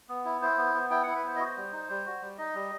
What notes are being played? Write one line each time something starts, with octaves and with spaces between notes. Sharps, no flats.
B3
E4
E4 C5
B3
B3
E4 G5
E4 F#5
B4
B3 C5
D#5
F#4 C5
G3
D#4
G3
F#4
G3
D#4 D#5
G3